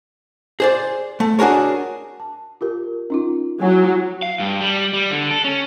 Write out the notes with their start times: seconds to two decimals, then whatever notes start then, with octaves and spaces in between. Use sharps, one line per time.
0.60 G#4 C5 D5
1.20 A3
1.39 D4 F#4 G#4 A#4 C#5
2.20 A5
2.61 F4 G4 A#4
3.10 C#4 D#4 F4
3.61 F#3 E4 G#5
4.22 F5
4.40 G2
4.61 G3
4.93 G3
5.11 D3
5.31 A4
5.44 C#4